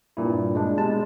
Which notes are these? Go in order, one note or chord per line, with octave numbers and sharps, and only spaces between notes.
G2 A#2 E4
G#3 D4
B2 G3 G#3 A5